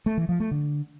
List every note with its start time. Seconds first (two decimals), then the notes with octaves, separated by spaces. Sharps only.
0.06 A3
0.17 E3
0.29 F3
0.40 A3
0.51 D3